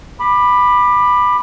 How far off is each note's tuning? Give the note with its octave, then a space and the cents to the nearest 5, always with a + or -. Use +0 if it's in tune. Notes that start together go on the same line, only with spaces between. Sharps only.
B5 +0 D6 +25